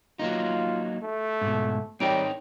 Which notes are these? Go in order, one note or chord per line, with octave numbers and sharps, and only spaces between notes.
F#3 A#3 D#4 F4
A3
G#2 B2
G3 C4 D#4 A#4 C#5 G5 D7